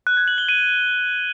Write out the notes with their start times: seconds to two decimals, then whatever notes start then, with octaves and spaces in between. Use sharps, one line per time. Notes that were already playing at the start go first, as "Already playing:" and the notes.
0.07 F#6
0.17 G#6
0.28 F#7
0.38 G7
0.49 D#7